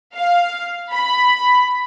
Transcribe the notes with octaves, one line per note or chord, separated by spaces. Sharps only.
F5
B5